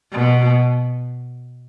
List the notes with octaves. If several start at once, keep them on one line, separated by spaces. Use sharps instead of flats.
B2